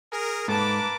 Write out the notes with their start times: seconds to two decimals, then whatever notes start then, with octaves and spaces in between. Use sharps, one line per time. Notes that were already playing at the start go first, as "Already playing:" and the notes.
0.11 G#4 A#4
0.48 G#2 A#3 A4 B4 A5 A#5 D6